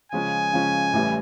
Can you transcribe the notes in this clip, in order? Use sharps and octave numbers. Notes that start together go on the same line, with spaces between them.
C#3 F3 G#3 C#4 G#5
C#3 F3 G#3 C#4
A1 A2 E3 G3